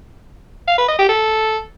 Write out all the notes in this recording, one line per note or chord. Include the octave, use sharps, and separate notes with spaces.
F5
B4
D#5
G4
A4